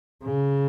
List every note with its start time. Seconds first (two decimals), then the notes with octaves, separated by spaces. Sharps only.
0.24 C#3